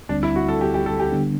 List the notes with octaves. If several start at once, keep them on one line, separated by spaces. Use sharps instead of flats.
D2 D3 G3 C4 D4
E4
F#4
A4
G4
G4
A4
G4
D3 G3 B3 D4